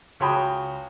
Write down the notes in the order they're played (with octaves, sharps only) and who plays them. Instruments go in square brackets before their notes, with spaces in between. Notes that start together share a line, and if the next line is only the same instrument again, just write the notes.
[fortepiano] C#2 F#4 C#5 G5 B5 D#6